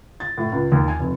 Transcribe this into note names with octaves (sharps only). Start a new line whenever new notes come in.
A6
A2
C#2
D#2
G#5
F1